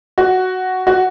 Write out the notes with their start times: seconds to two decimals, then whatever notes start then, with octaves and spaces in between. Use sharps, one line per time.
0.18 F#4
0.87 F#4